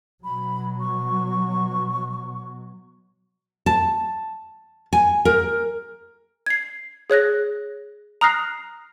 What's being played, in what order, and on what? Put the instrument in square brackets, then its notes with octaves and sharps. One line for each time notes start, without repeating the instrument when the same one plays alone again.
[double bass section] B2 F#3 [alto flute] B5
[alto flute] C#6
[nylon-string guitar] A5
G#5
A#4
[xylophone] G#6 C7
G#4 C#5 F#6 A#6
A#5 D#6 F6 F#6 A#6 C7